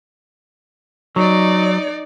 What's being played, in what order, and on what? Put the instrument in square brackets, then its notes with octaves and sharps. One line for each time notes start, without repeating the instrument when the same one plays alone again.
[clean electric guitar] F#3 [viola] D#4 D5